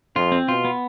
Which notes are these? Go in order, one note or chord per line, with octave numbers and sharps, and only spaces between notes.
F2 F4
C4
B2 F4
B3